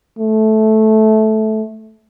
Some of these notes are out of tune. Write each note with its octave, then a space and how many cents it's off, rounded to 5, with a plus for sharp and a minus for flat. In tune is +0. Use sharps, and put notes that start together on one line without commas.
A3 -15